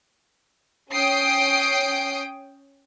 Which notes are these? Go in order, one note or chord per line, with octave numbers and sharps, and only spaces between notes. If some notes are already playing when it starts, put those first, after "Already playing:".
C#4 G5 D#6 C7 D7